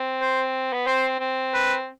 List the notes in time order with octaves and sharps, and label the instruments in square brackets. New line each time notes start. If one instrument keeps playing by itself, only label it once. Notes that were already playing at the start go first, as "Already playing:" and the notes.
Already playing: [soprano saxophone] C4
[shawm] C5
[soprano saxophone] B3
[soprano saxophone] C4 [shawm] C5
[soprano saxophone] C4
[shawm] B4